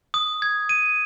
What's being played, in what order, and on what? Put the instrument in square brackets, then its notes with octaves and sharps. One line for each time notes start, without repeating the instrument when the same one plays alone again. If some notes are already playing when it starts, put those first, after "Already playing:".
[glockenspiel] D#6
G#6
D#7